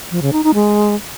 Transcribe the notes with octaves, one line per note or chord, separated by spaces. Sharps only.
F3
C#3
D#4
D#4
G#3